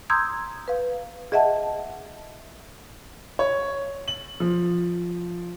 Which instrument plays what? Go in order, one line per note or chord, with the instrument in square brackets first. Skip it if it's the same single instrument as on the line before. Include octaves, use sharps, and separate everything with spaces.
[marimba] A#5 C6 D#6 E6 G6 G#6
B4 F5
G#4 D#5 E5 F#5 A5
[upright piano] C#5
F#7
F3